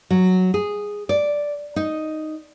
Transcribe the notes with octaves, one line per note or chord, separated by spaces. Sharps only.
F#3
G#4
D5
D#4